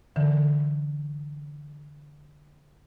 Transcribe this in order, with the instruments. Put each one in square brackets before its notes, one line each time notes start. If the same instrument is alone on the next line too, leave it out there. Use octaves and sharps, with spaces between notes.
[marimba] D3 E3